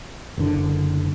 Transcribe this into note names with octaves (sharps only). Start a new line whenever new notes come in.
F#1 D3